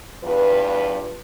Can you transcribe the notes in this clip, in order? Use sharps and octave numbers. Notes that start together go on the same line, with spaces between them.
E2 G2 F4 B4